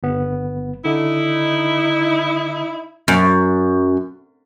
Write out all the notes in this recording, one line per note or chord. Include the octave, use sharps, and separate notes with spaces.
G1 B3
D3 D#4 E4
F#2